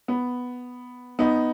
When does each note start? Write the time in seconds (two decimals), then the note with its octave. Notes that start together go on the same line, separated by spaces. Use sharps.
0.08 B3
1.19 B3 D#4